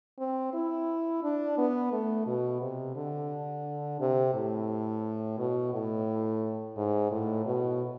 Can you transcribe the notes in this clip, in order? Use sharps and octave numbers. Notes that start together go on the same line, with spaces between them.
C4
E4
D4
B3
A3
B2
C3
D3
C3
A2
B2
A2
G#2
A2
B2